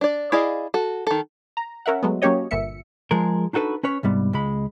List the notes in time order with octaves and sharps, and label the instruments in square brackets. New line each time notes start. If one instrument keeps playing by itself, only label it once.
[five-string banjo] D4 D5
E4 G#4 D5 D#5 F5
F#4 A4
D#3 A4
[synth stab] A#5
C#4 A#4 E5 F#5
F#3 G#3 A3 B3
F#3 A#3 C#4 G4 C#5 D#5
G1 A#2 E5 C#7
[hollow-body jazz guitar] F3 G#3 G#4 A#4
D4 D#4 F#4 A4 B4
C#4 B4 C#5
C2 G#2 G3 B3
C#2 G#3 B5